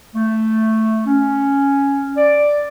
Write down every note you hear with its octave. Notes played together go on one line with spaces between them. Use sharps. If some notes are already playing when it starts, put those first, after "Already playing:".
A3
C#4
D5